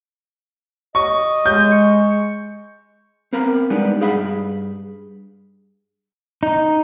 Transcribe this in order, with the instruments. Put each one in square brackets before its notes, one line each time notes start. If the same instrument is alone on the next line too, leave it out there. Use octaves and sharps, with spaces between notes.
[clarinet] D#5 [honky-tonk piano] C#6
[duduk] G#3 [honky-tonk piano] G6
[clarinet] C#6
[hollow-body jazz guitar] B3 C4 A#4 F5 A#5 B5
G3 G#3 B3 D4 D#4
G2 G#4 F5 F#5 B5
[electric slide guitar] D#4